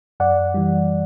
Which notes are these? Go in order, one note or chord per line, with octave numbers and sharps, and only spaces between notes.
F#2 D5 F#5
E3 G3